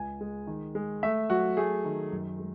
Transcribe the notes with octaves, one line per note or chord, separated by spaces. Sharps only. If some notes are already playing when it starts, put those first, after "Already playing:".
Already playing: C#2 G#5
G#3
D#3
G#3
A3 E5
F#3 F#4
A3 G#4
D#3
F#2
G#3